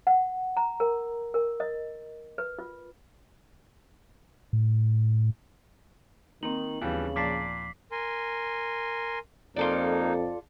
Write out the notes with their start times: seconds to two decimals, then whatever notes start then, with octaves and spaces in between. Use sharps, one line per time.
0.07 F#5
0.57 A#5
0.80 A#4
1.34 A#4
1.60 D#5
2.38 B4
2.59 F4
4.53 A2
6.43 D#3 A#3 C4 D#4 F#7
6.82 D#2 C#3 E3 F3 G3 B3
7.16 A#2 F3 D5 A5 D6 B6 C7
7.92 A#4 G#5 C6
9.56 F2 A#3 D#4 F4 A4 D5